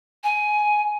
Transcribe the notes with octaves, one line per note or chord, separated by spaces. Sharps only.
G#5